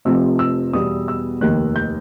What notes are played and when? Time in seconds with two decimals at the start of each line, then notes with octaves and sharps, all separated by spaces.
0.05 F1 F2 C3 F3 E6
0.39 E6
0.73 E2 B2 G3 D#6
1.08 E6
1.41 F1 D#2 D#3 F#6
1.76 G6